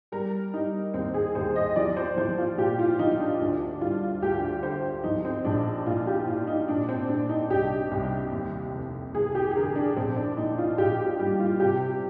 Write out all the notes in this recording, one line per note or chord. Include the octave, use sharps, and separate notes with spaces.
G3 A#4
G3 D#4
D#2 C4
G#4
D#2 C5
D#5
F3 D5
C5
F3 C5
F4
A#2 G4
F4
F3 D#4
D4
D2 D4
G3 F4
D2 G4
D3 C5
F3 D#4
C4
A#1 D4
A#2 F4
G4
A#2 F4
D#4
A#2 D4
C4
A#2 D4
D#4
C2 G4
C2
D#2
F1
F1 G#4
G4
G#4
D3 A#4
D4
A#1 C4
D4
A#2 D#4
F4
A#1 G4
G4
G3 G4
F4
C3 G4